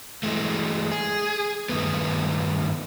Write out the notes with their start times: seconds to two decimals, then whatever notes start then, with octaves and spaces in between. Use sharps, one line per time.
0.23 E3 G#3 A3
0.92 G#4
1.69 G2 D#3 A3 B3